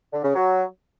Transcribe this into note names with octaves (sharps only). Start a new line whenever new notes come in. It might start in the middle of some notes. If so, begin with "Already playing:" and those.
D3
C#3
F#3